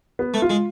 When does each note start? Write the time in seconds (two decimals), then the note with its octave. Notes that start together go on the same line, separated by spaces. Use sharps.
0.19 B3
0.34 A3
0.42 F4
0.50 G#3